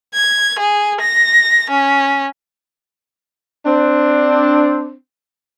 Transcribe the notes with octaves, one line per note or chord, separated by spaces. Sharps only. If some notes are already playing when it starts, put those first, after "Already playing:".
G#6
G#4
A#6
C#4
C4 D4